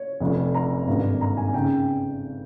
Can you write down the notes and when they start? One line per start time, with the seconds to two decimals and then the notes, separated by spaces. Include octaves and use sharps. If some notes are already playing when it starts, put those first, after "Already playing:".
Already playing: C#5
0.20 F1 F2 C3
0.54 A#5
0.87 G#1 G2 D#3 A#3
1.21 A#5
1.37 G#5
1.54 C#3 G5